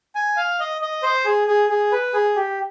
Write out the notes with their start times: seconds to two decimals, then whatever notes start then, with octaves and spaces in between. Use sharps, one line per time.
0.15 G#5
0.37 F5
0.60 D#5
0.81 D#5
1.03 C5
1.25 G#4
1.48 G#4
1.69 G#4
1.92 B4
2.14 G#4
2.36 G4